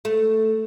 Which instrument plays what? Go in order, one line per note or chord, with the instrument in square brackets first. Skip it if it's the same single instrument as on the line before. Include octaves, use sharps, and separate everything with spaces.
[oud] A3